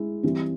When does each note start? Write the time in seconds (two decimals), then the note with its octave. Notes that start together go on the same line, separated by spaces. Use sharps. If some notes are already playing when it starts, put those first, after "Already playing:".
Already playing: G#3 E4
0.23 E3 G3 C4